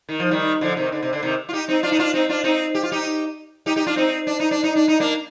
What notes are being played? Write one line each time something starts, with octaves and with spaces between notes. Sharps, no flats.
D#3
F3
D#3 G3
D3 F3
C3 D#3
D3
C3
D3
C3 D#3
F4
D#4 G4
C4 D#4
D4 F4
D#4
D4 F4
C4 D#4
D4 F4
C4 D#4
G4
F4
D#4 G4
D#4 G4
D#4 G4
D4 F4
C4 D#4
D4
D#4
D4
D#4
D4
D#4
A#3 D4